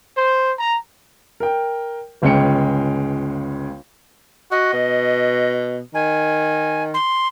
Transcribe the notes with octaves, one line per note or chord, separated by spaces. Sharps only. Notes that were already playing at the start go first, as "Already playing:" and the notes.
C5
A#5
A#4 G5
G1 C#2 G#3 C#4 G5 C#7
F#4 D#5
B2
D#3 G#5
C6